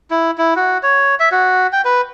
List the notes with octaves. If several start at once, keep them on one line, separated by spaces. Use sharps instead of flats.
E4
E4
F#4
C#5
E5
F#4
G5
B4